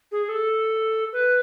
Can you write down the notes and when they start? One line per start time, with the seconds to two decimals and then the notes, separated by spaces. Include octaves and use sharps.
0.11 G#4
0.28 A4
1.12 B4